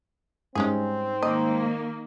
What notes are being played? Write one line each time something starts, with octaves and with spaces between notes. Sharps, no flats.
G#2 G3 G#3 C4 C#4 G#4
D#3 A#3 D#5